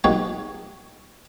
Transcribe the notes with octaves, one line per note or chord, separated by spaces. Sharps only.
A#1 F#3 G3 D#4 G#4 C#5